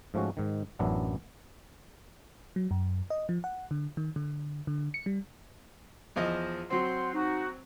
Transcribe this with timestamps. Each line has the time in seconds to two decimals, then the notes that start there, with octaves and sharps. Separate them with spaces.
0.14 G#2 F3 A3 C#4 F#4
0.37 G#2 D#3
0.79 A1 F#2 F#3 B3 D4 E4
2.56 F#3
2.71 F#2
3.10 D#5
3.29 F3
3.44 F#5
3.71 D3
3.97 D#3
4.16 D3
4.67 D3
4.94 C#7
5.06 G3
6.16 E2 F3 D#5
6.70 F#3 C4 C5 F#5 C6
7.14 D#4 F#4